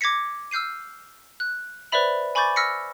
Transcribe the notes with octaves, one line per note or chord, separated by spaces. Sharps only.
D6 G#6 A#6 B6 C#7
E6 F6 G6 C7 D#7
F#6
B4 C5 D5 E5 B5 F7
G#5 B5 C#6 D6 G6 A6
E6 F6 A#6 B6 C#7